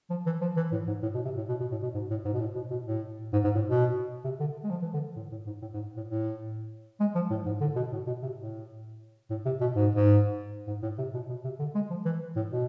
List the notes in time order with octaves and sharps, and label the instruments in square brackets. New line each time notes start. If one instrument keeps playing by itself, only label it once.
[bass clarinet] F3
E3
F3
E3
A2
G#2
A2
B2
C3
A2
B2
B2
A2
B2
G#2
A2
G#2
B2
A2
B2
B2
A2
G#2
G#2
A2
B2
C3
D3
G#3
F3
E3
D3
A2
A2
G#2
A2
G#2
A2
A2
G#3
F3
A2
G#2
D3
B2
A2
B2
C3
A2
A2
C3
B2
G#2
G#2
G#2
A2
C3
B2
B2
C3
D3
G#3
F3
E3
A2
B2